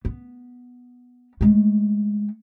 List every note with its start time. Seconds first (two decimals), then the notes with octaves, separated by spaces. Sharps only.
0.05 B3
1.41 G#3 A3